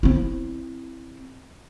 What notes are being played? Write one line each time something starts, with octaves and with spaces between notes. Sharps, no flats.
C4 E4